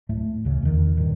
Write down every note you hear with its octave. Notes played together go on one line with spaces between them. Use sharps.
D1 A2 A3
D2 C#3
E2 D#3
G2 A#2 D#3